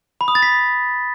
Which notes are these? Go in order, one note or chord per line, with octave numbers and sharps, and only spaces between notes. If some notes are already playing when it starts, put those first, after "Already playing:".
B5
D#6
A6
B6